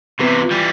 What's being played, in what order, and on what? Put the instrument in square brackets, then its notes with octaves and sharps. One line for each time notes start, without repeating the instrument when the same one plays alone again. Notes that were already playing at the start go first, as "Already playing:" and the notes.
[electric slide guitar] C3 E3 [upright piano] B3
[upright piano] F4
[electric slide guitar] E3 G3